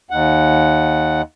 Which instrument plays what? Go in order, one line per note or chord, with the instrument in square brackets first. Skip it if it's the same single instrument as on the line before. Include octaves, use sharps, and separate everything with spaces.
[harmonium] D#2 F#5